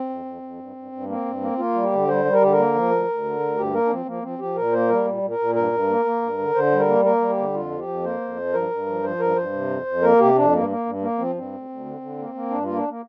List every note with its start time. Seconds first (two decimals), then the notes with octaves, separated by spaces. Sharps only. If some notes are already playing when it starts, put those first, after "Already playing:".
Already playing: C4
0.09 F2
0.25 F2
0.42 F2
0.59 G2
0.76 G2
0.92 G2
1.08 A#3 C4
1.25 G2
1.41 A#3
1.58 A#3 F4
1.74 G3
1.83 G4
1.92 D3
2.08 G3 C5
2.25 G3
2.33 A#4
2.41 D3 G4
2.52 A#4
2.57 A#3
2.74 F3
2.91 D2
3.08 D2
3.24 D3
3.40 D2
3.57 G2 G4
3.73 A#3 A#4
3.85 D4
3.90 F3 C4
4.06 F3 A#3
4.23 F3 C4
4.39 F3 G4
4.56 A#2 A#4
4.73 A#3 C5
4.89 G3 A#4
5.06 A#2
5.22 A#2
5.30 A#4
5.39 A#2
5.55 G2 A#4
5.72 G2
5.89 A#3
6.05 A#3
6.22 G2
6.38 D3
6.55 D3 C5
6.72 G3
6.79 A#4
6.88 A#3
7.05 A#3 A#4
7.21 G3
7.29 G4
7.37 D3
7.54 F2 F4
7.71 F3
7.79 G4
7.87 F2
8.04 A#3 C5
8.21 F2
8.37 F3
8.53 G2 A#4
8.71 G2
8.86 F3
9.03 F3 C5
9.20 G2 A#4
9.36 G2 C5
9.53 C3
9.70 F2
9.86 F2
10.02 A#3 A#4
10.19 C3 G4
10.35 F2 D4
10.53 G2 A#3
10.70 A#3
10.85 G2
11.01 A#3
11.18 F3 C4
11.35 G2 C4
11.52 D2
11.69 D2
11.85 D3
12.01 D3
12.18 A#3
12.34 A#3
12.51 G2 D4
12.64 A#3 F4
12.76 D4
12.88 A#3